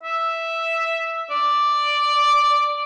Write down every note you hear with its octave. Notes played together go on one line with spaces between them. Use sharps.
E5
D5